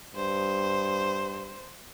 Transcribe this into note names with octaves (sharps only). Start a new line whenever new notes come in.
G2 C5